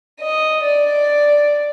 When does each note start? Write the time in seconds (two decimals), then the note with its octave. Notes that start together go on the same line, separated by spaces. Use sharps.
0.21 D#5
0.64 D5